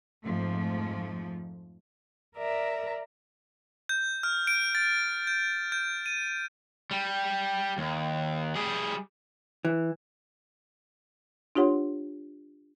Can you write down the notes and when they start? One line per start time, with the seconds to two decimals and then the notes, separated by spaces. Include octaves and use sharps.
0.24 F2 G#2 F3 A3
2.37 A#4 D5 E5 A#5
3.89 G6
4.23 F6
4.47 D7
4.75 A6
5.27 G6
5.72 G6
6.06 D#7
6.91 G3
7.78 D#2
8.56 G3 G#4
9.65 E3
11.55 D4 F4 G4 C#5 F#5 C6